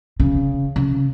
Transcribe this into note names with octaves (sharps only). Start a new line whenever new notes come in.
C#3
C#3